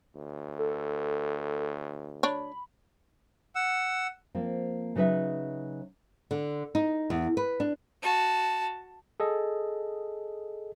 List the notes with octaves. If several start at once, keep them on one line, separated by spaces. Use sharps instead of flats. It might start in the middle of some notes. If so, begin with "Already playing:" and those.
D2
A4
D4 C#5 B5
F#5 E6
F3 A#3 C4
C#3 F#3 D#4 B4 E5
D3
D#4
E2
B4
D4
F#4 A5
G#4 A4 D#5